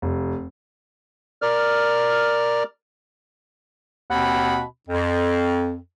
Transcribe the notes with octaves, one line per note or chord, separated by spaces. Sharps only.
F1
A#4 D5 F6
D#2 B2 C4 F#5 B5
F2